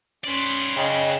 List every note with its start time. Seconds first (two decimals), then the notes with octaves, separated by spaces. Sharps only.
0.24 C#4 B4 D5 C6
0.77 C#3 D#5 G5